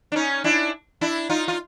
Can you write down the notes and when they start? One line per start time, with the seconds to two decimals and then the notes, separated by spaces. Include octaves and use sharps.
0.12 D4
0.16 C#4 D#4
0.44 D4 E4
1.01 D4 E4
1.29 D#4 F4
1.48 F4